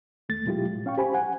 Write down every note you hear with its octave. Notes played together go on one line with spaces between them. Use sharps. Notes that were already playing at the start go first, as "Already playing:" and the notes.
D#2 A3 A6
B2 F#3 G#3 E4 F4 G4
A2
C#4 F5 G5 C#6
G4 C5 G#5 B5
F#5 G#5